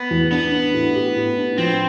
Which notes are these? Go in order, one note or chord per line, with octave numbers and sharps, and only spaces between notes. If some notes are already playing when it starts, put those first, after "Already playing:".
Already playing: B3
E2
B3 D4
D4
A2
G4
A2
D4
F3 C4